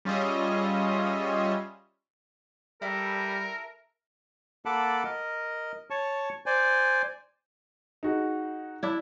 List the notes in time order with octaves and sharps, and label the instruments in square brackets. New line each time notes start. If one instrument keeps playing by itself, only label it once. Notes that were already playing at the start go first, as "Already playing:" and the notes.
[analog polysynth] G3 C#4 F4 G#4 D#5 E5
[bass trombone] G3 [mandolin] E4 A4 [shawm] A#4
[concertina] A#3 A4 F#5 A5 B5 D6
A#4 D#5
C#5 A5 C#6
C5 D5 G#5
[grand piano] D#4 F#4 G#4
[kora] D4 E4